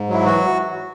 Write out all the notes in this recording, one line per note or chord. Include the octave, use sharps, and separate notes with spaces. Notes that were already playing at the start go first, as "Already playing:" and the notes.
Already playing: G#2
F#3 E4
E3 F#4